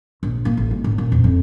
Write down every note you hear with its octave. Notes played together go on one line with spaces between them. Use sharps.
A#1
A#3
A1
G#3
A1
A#2
E2
F2